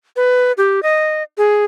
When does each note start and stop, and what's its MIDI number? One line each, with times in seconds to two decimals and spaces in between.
0.16 0.52 71
0.58 0.83 67
0.83 1.23 75
1.38 1.65 68